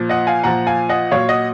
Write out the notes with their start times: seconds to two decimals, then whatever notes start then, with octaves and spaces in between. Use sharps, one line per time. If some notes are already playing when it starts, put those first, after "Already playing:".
Already playing: A#2 F3
0.09 D#5 F#5
0.27 F5 G#5
0.44 A#2 F3 F#5 A#5
0.67 F5 G#5
0.89 D#5 F#5
1.11 A#2 F#3 C#5 F5
1.29 D#5 F#5